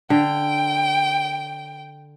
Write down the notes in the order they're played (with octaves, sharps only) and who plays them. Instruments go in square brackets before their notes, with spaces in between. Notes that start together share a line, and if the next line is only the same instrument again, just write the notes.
[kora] D3 [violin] G5